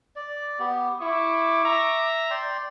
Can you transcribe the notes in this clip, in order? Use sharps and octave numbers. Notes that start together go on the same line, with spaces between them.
D5
B3 G4
E4 C#6 D6
E5 A#5
D5 G5 C6